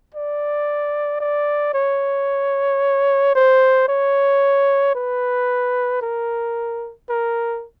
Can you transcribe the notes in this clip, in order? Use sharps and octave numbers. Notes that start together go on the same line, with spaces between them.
D5
D5
C#5
C5
C#5
B4
A#4
A#4